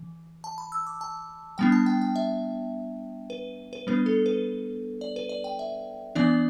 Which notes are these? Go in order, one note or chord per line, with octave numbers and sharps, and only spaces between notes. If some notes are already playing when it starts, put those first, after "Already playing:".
Already playing: E3
A5
B5
E6
D6
A5
G3 B3 D4 G5
A5
G5
G5
E5
B4
B4
G3 B3 D4 B4
A4
B4
D5
B4
D5
G5
E5
E3 B3 D4 D5